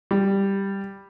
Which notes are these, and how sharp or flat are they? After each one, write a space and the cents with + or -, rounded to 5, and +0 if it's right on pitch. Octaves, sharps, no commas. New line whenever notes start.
G3 +5